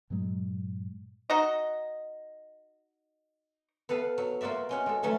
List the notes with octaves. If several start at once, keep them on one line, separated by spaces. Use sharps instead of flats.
G2 A#2 F#3 G#3
D#4 F#4 D#5
B3 A4 B4 F5
F#3
A#3 F4 F#4 D5 E5
G#3 C#4 F#4
G#3 A4
D3 E3 F#3 A3 C#4